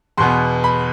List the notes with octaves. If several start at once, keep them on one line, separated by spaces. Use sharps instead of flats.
E2 B2 B3 C6
B5